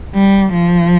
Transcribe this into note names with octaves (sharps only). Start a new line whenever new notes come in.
G3
F3